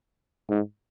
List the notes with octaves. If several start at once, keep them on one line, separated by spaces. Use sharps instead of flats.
G#2